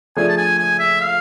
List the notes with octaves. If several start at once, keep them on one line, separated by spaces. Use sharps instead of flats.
F3 A3 D4 G#4 G#5
A5
G#5
G#5
E5
F5